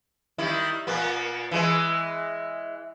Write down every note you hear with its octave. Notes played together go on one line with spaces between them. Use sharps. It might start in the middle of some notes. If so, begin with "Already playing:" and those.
D#3 G3 E4
A#2 A#3 B3
E3 G#3